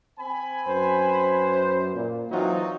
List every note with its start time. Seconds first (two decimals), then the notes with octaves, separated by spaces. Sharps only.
0.19 C4 G#5 B5
0.66 F#2 B4 C5
1.95 A#2
2.31 E3 F#3 C4 D#4 F4 F#4